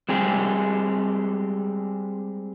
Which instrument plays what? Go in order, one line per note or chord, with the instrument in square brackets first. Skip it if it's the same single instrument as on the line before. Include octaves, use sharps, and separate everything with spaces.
[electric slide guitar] G3 G#3 C4 G4 G#4